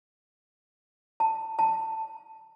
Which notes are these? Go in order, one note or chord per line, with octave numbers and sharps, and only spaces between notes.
A5
A5